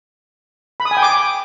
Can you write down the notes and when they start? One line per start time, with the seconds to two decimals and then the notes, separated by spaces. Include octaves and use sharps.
0.80 B5
0.85 D#6
0.91 G#5
0.97 G5
1.03 D6